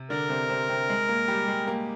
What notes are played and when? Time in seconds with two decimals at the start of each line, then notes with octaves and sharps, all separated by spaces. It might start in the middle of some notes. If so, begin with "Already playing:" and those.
Already playing: C3
0.10 D3 D4 A#4
0.29 C3 C4
0.49 C3 C4
0.69 C3 C4
0.89 G#3
1.09 A#3
1.28 G3 G4
1.48 G#3
1.67 A#3